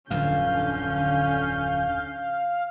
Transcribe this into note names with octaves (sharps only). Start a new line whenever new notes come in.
D1 F2 D3 C#4 F5 G6